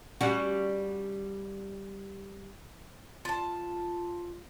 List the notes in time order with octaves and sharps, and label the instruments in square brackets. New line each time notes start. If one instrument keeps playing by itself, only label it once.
[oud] G3 C#4 F#4
[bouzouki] F4 A5